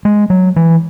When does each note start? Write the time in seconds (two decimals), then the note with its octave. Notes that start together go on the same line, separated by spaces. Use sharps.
0.05 G#3
0.30 F#3
0.56 E3